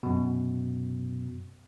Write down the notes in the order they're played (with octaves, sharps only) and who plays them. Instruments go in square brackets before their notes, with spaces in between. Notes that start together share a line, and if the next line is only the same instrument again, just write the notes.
[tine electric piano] F#2 B2